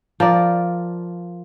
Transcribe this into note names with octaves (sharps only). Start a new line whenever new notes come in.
F3 A#4 D5